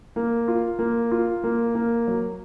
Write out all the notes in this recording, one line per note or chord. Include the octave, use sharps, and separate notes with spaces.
A#3
F4
A#3
F4
A#3
A#3
F#3